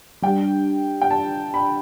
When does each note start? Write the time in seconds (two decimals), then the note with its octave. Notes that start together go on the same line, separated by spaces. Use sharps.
0.22 G3 D4 G4 G5
1.02 G5
1.11 A5
1.54 B5